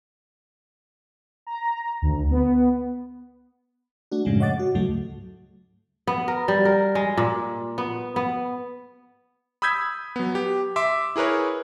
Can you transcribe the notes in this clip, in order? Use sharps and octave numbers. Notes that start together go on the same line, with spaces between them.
A#5
D2
B3
A3 D4 F#4
F#2 A2 C#3 F3 G#3
C#5 D#5 F#5 D6 A6
F#4
D2 G#2 C#3 F#3 A3
B3
A#4
G3
A#4
G#3
A#2
B3
B3
B5 D#6 E6 G6 G#6 B6
F#3 B3
G4
E5 C6 D6
E4 G#4 A#4 B4 C#5